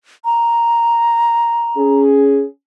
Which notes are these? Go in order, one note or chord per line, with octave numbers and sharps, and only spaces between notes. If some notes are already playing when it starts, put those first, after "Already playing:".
A#5
C#4 G#4